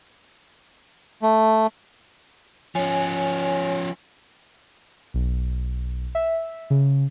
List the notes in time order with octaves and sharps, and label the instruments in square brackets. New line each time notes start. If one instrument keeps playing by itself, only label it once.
[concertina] A3
[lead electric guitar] F3 C#4 [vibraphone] C#5 G#5
[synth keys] B1
E5
C#3